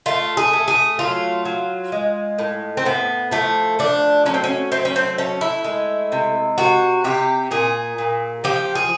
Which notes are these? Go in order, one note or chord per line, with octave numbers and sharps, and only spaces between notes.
A3 F4
G#4
A3
G#4
F#3 F4
F#3
G#3
A2
C4
A2 B3
F3 A3
A3 D4
F#3 C#4
C4
C#4
A3 C4
C#4
C4
A3 C#4
E4
G#3
C3
C3 F#4
C3 G4
A#2 G#4
A#2
F3 G4
G#4